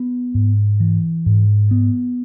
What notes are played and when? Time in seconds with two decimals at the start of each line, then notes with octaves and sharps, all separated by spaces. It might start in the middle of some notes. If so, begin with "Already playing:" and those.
Already playing: B3
0.35 G#2
0.80 E3
1.26 G#2
1.71 B3